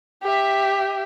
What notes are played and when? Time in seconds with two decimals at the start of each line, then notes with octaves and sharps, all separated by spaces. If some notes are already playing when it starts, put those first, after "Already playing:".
0.23 G4 E5